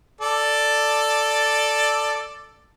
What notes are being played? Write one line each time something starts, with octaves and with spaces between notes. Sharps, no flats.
A4 D5